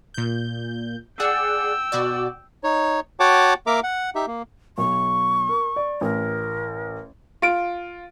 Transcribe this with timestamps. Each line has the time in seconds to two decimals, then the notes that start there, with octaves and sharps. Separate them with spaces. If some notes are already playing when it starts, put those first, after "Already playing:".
0.14 A#2 G6
1.20 G#4 D5 F#5 G5 E6
1.92 B2 F#4 D5
2.64 D#4 C#5
3.20 F#4 C#5 F#5 G5 A5 D6
3.67 A#3 A#4 E5 A#5 D6
3.83 F#5
4.15 D#4 G4 E5
4.27 A#3
4.78 B1 C#6
5.49 A#4
5.76 D5
6.01 A1 A#4
7.42 F4 D7